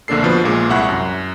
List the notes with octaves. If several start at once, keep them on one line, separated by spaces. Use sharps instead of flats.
A#1 D3 A#3 D4 A4 C7
B2 F3 B4
A#1 A#2 G#3
C2 E4 F#5 C#6 F#6
F#2